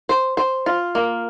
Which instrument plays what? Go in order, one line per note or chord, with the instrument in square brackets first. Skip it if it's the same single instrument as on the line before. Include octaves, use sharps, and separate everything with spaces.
[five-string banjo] C5
C5
F4
A#3